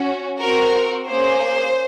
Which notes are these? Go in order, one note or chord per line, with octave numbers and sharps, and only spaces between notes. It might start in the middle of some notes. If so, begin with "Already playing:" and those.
Already playing: C#4 F#4
C4 F#4 A#4
A#3 C#4 G#4 C5